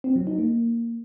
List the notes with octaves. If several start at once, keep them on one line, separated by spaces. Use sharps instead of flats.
C4
F#3
D#4
A#3